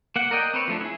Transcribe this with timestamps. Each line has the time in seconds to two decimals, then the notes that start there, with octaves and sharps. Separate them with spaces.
0.16 A#3 F#5
0.31 A#4 D5 D#5 G5
0.53 C4 B4 C#5
0.68 F3 A3 D4
0.81 E4 G#4